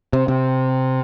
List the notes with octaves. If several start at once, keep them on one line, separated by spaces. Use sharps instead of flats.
C3
C3